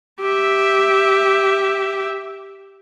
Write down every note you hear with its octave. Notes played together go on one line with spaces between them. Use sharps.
G4 E5